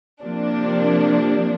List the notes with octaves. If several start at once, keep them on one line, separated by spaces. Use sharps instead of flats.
C3 F3 A#3 D4